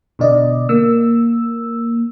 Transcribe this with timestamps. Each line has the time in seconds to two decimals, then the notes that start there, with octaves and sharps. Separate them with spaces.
0.19 B2 D3 D5 D#5
0.69 A#3 E6